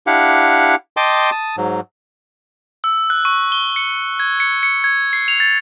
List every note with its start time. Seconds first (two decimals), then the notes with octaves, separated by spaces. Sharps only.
0.07 D4 E4 G4 F5 F#5
0.97 D#5 G5 A5 C6 D6 D#6
1.32 A5 D#6
1.57 G#2 F#3
2.84 E6
3.10 F#6
3.25 C#6
3.52 G7
3.76 C#7
4.20 G#6
4.40 C#7
4.63 C#7
4.84 G#6
5.13 C7
5.28 F7
5.40 A6